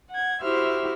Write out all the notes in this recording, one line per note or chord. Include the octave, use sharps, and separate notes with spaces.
F#5 G#6
E4 F#4 G4 C5 E5 F6